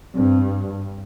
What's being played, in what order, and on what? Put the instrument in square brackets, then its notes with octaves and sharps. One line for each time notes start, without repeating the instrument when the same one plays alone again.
[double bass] G2 [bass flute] C4